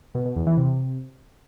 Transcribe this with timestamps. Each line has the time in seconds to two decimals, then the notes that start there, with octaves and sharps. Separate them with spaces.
0.15 B2
0.25 B2
0.36 E2
0.47 E3
0.57 C3